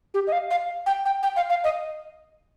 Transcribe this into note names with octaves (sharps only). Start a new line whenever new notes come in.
G4
D#5
F5
F5
G5
G5
G5
F5
F5
D#5